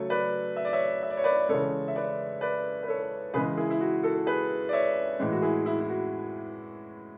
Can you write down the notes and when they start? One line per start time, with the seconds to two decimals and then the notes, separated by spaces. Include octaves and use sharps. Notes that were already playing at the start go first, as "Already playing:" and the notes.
Already playing: C#3 F#3 A3 A4 C#5
0.10 B4 D5
0.56 E5
0.65 D5
0.73 C#5 E5
1.02 E5
1.10 D5
1.17 C#5
1.24 B4 D5
1.49 C#3 E3 G#3 A4 C#5
1.88 E5
1.95 B4 D5
2.41 B4 D5
2.83 B4
2.88 A4 C#5
3.34 C#3 E3 G#3 G#4 B4
3.57 E4 G#4
3.70 E4
3.80 F#4
4.03 F#4 A4
4.26 G#4 B4
4.69 D5
4.73 C#5 E5
5.20 A2 E3 G#3
5.32 F#4
5.42 E4 G#4
5.66 E4
5.80 E4
5.89 F#4